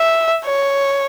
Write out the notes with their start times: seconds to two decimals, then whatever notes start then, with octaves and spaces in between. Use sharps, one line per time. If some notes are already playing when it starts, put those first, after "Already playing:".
Already playing: E5
0.46 C#5